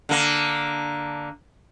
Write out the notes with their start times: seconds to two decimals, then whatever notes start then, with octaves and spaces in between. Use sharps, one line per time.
0.09 D3 A#3